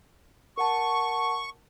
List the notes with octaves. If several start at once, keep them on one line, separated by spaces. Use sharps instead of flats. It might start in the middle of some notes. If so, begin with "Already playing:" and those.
A#4 F#5 A5 C#6